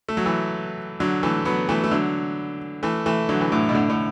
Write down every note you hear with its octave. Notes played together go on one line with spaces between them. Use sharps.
A3
F#3
E3 A3
D3 F#3
E3 A3
F#3 B3
E3 A3
A3
D3 F#3
E3 A3
E3 A3
D3 F#3
E3
A2 D3
B2
A2 D3
A2 D3